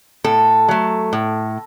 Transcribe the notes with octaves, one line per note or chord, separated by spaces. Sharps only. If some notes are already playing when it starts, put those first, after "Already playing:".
A2 A4
F#3 A3
A2